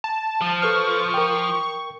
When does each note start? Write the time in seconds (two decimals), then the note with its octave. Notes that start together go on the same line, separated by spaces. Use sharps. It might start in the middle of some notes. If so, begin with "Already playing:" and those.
0.04 A5
0.42 F3
0.62 A4 B4 C#6 F6
1.14 A#4 G5